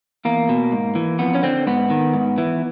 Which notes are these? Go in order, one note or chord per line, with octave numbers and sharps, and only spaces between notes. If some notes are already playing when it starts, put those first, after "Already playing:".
E2 A#3
B2
G#2
E3
F2 B3
C#4
D3 C4
G#2 B3
D#3
G#2
E3